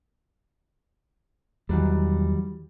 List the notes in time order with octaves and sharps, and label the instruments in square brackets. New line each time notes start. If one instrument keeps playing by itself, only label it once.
[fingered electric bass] E2 E3 [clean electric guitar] D#3 F#3 G3